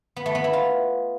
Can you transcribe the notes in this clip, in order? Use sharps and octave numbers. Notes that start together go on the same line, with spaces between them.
B3
A3
B3
E4
F4